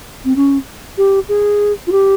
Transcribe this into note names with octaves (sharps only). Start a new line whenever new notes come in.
C4
C#4
G4
G#4
F4
G4